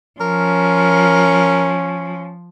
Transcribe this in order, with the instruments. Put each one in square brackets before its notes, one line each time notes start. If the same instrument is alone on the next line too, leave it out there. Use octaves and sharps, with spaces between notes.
[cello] F3 [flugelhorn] C#4 [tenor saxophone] A#4